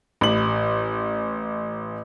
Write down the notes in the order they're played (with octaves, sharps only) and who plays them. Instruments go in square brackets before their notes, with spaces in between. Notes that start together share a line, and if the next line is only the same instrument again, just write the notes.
[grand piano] A1 F#7